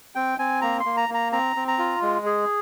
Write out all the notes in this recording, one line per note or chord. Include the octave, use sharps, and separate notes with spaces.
C4 G5
C4 G#5
A#3 A#5
C6
A#3
A#5
A#3
A#5
C4 A#5
C4
A#5
F4
G#3
G#4